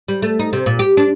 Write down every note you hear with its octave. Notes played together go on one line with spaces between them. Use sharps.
G3
A3
D#4
C3
A#2
G4
D4